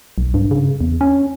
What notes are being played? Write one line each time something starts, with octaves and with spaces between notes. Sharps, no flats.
B1
G2
C#3
E2
C#4